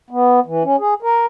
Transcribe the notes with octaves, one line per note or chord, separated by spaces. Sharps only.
B3
E3
C#4
G#4
A#4